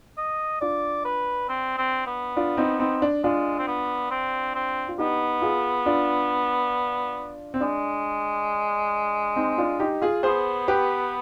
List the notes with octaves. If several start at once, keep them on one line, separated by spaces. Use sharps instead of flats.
D#5
D4 F4 D5
B4
C4
C4
B3
D4 F4
C4 D#4
C4 D#4
D4
G#3 D4 F4
C4
B3
C4
C4
F4
B3 D#4 G4
F4 G#4
D4 F4
C4
G#3 D4
C4 D#4
D4 F4
D#4 G4
F4 G#4
B3 G#4 C5
G4 B4